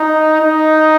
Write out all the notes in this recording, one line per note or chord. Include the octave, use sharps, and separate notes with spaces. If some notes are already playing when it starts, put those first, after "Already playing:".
Already playing: D#4
D#4